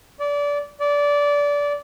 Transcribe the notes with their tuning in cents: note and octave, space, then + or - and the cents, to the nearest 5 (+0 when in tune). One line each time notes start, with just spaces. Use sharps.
D5 -25
D5 -20